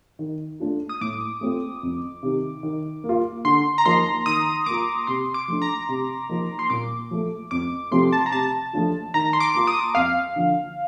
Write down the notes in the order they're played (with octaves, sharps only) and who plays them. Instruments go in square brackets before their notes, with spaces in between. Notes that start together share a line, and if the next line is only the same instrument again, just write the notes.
[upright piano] D#3
A3 D4 F4
[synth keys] D#6
[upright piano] A2 [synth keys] D6
[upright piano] A3 C4 F4
F2
C3 D#3
D#3
A#3
F4
[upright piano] D3 [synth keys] C6
[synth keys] A#5
[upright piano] F3 A#3 D#4 [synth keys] C6
[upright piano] D#3 [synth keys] D#6
[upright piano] A#3 F4 [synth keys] D6
[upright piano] C3 [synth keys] C6
[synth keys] D6
[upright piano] F3 A3 D4
[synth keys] A#5
[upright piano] C3
F3 A#3 D#4
[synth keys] C6
[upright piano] A#2 [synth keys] D6
[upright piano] F3 A3
[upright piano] F2 [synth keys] D6
[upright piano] C3 F3 A3 C4 [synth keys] C6
[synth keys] A5
A#5
[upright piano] C3 [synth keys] A5
[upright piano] F3 A3 D4 F4
[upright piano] D#3 [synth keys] A#5
[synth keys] C6
D6
[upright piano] A#3 F4
[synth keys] D#6
[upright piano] F2 [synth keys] F5
[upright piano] D3 F3